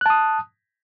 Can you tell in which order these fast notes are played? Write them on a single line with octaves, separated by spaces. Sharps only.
F#6 A5 D#6